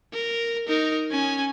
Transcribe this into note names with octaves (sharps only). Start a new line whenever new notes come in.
A#4
D#4 A#4
C#4 G#5